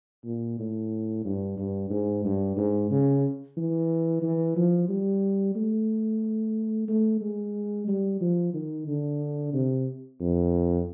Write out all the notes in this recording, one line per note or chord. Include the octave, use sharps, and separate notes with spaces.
A#2
A2
G2
G2
G#2
G2
G#2
C#3
E3
E3
F3
G3
A3
A3
G#3
G3
F3
D#3
D3
C3
F2